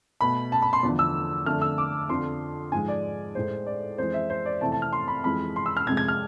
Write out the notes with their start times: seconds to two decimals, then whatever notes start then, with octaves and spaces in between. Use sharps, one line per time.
0.21 B2 A3 B5
0.52 A5
0.62 B5
0.73 C6
0.83 E2 D3 F3 A3
0.99 E6
1.46 F2 D3 A3 F6
1.62 E6
1.78 D6
2.09 F2 D3 F3 C6
2.72 G#2 F3 G#3 G#5
2.88 D5
3.35 A2 G#3 C5
3.66 D5
3.98 F2 E3 G#3 C5
4.14 E5
4.30 C5
4.45 D5
4.61 F2 C3 E3 A3 A5
4.72 A5
4.82 F6
4.93 C6
5.08 B5
5.24 F2 E3 G#3 B5
5.56 C6
5.66 E6
5.77 F6
5.87 F2 C3 G#3 G#6
5.97 G#6
6.08 F6